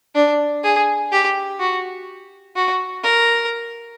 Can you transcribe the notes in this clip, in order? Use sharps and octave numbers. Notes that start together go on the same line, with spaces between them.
D4
G#4
G4
F#4
F#4
A#4